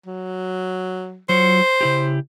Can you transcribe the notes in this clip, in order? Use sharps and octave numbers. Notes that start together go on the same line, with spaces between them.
F#3
F#3 F4 C5 C#5
C#3 E4 G4